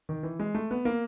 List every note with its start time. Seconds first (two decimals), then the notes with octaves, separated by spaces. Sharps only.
0.09 D#3
0.23 E3
0.40 G#3
0.55 A3
0.71 B3
0.85 A#3